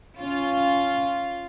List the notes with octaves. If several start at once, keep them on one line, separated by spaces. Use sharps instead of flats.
C#4 F4